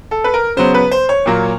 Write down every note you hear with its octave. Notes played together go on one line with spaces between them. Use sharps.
A4
B4
A#4
C#3 F#3 B3 C5
B4
C5
C#5
A#2 F#3 A#3